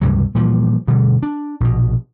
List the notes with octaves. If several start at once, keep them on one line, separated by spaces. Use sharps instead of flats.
C#2 G2 C3 F#3
A#2 E3 F3 G3
G2 B2 D3 G3
D4
A#1 B2